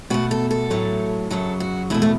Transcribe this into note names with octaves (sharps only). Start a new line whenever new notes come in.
B2 A3 F#4
A4
A4
A2 F#3 A3
F#2 C#3 F#3 A4
F#4
E2 B2 A3 E4
A3